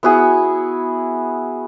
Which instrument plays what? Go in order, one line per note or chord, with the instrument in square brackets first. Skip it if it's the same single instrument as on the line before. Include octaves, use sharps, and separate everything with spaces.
[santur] B3 E4 F#4 G#4